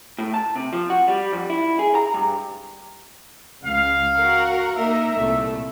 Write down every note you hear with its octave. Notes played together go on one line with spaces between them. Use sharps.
A2
A5
C3
F3
F#4
G3
F2
E4
G#4
A#5
G2
C#2 F5
F#4 A#4 F#5
A#3 D#4 A#4 E5
C2 A#2 A3